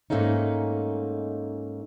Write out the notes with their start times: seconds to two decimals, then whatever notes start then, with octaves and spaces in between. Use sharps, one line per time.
0.10 G#2 A3 A#3 C#4 D#4